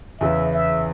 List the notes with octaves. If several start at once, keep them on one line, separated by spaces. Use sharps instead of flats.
E2 C#3 E3 E5
E5